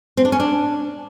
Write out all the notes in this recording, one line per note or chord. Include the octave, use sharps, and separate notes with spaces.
C4
D4
C#4
D4